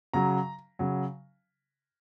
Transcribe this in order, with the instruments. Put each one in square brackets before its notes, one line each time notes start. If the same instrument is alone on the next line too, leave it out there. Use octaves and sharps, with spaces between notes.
[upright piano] C#3 F#3 A#5
C#3 F#3